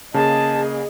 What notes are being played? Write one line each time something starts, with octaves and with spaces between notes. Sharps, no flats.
C#3 A#3 G#4 D#5 A5